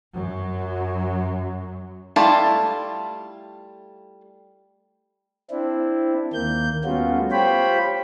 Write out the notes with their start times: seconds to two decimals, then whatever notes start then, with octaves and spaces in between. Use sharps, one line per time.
0.14 F#2 F#3
2.16 G3 A3 E4 F4 A4
5.51 C4 D4 E4
6.33 D#2 A#3 G6
6.84 G3 A3 B3 C#4 F4 F#4
7.32 F4 G4 C5 C#5 G5 B5